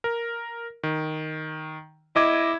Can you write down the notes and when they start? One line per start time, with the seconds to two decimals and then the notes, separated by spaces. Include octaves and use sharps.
0.04 A#4
0.83 D#3
2.16 E4 D#5 D6 G#6